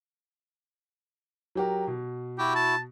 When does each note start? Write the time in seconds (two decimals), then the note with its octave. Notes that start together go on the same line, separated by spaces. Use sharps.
1.55 F#3 G4 A#4
1.87 B2
2.38 E4 F#4 G4
2.56 A5